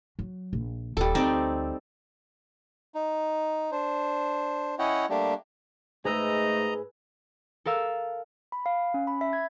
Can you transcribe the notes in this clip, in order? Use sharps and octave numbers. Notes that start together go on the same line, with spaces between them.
F#3
A#1
D#1 G3 A4
D2 C4 D#4 D5
D#4
D4 C5
C#4 E4 C#5 D#5 F#5 G5
G3 A3 A#3 D4 G4
G#2 A3 G#4 B4 D#5 A#5 E6
A4 A#4 F5 E6
B5
F5
C#4
B5
E5
G#6